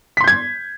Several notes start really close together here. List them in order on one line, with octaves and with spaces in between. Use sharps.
B6 C6 G6 G#6